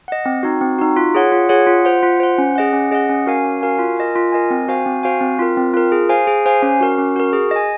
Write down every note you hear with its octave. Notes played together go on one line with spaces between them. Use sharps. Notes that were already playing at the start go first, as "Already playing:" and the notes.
D#5 F#5
C4
D#4 F#4
C4
D#4 F#4
F4
G#4 C#5 F#5
F4
G#4 C#5 F#5
F4
C5 F#5
F4
C5 F#5
C#4
G#4 D#5 F#5
C#4
G#4 D#5 F#5
C#4
F#4 A#4 F5 G#5
C#4
F#4 A#4 F5 G#5
F4
A#4 D#5 G#5
F4
A#4 D#5 G#5
C4
F#4 C5 F5 G#5
C4
F#4 C5 F5 G#5
C4
F4 A#4
C4
F4 A#4
G#4
C5 F5 G#5
G#4
C5 F5 G#5
C#4
F#4 A#4
C#4
F#4 A#4
G#4
D#5 G#5